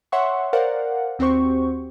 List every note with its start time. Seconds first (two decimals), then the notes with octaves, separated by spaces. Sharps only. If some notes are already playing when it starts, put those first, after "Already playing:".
0.12 C#5 E5 F#5 C6 C#6
0.53 A#4 C5 D5 F5 F#5
1.19 D#2 C4 F#4 G4 C5 C#6